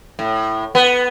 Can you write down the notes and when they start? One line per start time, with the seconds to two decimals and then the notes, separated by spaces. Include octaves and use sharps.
0.19 A2
0.75 B3